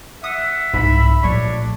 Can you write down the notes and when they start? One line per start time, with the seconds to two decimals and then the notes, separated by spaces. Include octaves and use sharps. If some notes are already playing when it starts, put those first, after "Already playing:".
0.24 E5 F#5 D#6
0.74 C2 G#2 B5
1.23 A#1 A3 D4 C#5